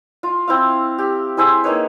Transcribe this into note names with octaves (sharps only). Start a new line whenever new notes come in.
F4
C4 E4 F5
G4
E4 G#4 C5 E5
A#3 D#4 B4 C#5